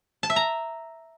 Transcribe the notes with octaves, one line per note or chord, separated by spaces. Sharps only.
A5
E5
A#5